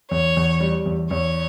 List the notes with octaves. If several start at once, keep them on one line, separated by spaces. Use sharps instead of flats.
E2 C#5
E2
G3
E2
E2 C#5